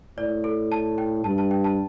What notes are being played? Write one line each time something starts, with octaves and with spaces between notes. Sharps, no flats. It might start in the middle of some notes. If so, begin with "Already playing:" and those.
A2 D5
A4
A5
G5
G2 A5
A5
G5
A5